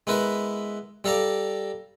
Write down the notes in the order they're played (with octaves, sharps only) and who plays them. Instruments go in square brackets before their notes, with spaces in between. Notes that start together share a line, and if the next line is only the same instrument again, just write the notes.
[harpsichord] G#3 B3 E4 A#4 B4
G3 A4 F5 A#5 D6